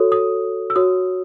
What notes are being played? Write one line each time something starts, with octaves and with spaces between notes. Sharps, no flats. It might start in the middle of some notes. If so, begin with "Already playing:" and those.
Already playing: F#4 A4 C#5 D#6
D#6
E6
F#4 C#5 D#6